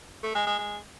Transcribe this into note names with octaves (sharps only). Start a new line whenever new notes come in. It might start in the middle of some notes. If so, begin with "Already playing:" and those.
A3
G#3
G#3
G#3